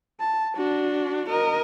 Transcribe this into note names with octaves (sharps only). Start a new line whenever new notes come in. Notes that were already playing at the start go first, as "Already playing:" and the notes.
A5
D4 F#4
A#4 D#5